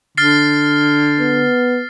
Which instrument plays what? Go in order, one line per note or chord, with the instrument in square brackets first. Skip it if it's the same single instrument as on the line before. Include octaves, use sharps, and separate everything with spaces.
[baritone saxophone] D3 [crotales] F6 A6 C7
[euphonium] B3